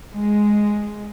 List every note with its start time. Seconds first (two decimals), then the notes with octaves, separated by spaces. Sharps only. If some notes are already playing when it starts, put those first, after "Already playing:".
0.13 G#3